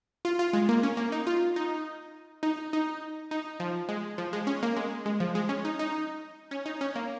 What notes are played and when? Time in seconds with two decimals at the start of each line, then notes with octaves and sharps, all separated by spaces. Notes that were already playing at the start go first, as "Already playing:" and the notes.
0.25 F4
0.39 F4
0.53 G#3
0.69 A#3
0.83 C#4
0.97 A#3
1.12 D#4
1.27 F4
1.56 D#4
2.43 D#4
2.73 D#4
3.31 D#4
3.60 F3
3.89 G#3
4.18 F3
4.33 G#3
4.47 C#4
4.63 A#3
4.76 G#3
5.06 G#3
5.20 F3
5.35 G#3
5.49 C#4
5.65 D#4
5.79 D#4
6.51 C#4
6.66 D#4
6.81 C#4
6.96 A#3